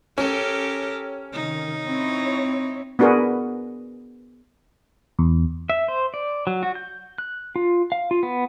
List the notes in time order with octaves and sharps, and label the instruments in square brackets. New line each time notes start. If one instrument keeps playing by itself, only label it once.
[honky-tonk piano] C#4 [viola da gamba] G4 A4 A#4
[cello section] C3 D#3 [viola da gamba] D#4
[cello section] C4 E4 C#5
[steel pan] B3 D4 F#4 G#4 A#4 B4
[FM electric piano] E2
[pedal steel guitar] E5
C5
D5
F#3
F#4
G6
F#6
F4
F5
F4
B3